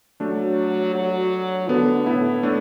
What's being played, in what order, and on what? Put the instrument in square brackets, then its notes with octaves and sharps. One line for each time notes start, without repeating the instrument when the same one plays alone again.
[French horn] F#3 [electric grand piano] A3 D4
[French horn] F#3
[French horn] D3 [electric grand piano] B3
[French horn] A2 [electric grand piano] B3 E4
[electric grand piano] A3 D4